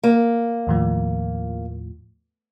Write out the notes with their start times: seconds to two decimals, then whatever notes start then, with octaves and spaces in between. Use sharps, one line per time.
0.03 A#3
0.67 D#2 A2 F3